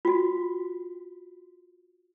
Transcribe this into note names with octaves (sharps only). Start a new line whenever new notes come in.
F4 F#4